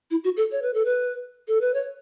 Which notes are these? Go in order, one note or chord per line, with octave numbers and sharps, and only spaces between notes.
E4
F#4
A4
C#5
B4
A4
B4
A4
B4
C#5